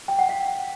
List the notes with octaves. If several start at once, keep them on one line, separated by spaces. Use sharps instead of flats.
G5
F#5
F5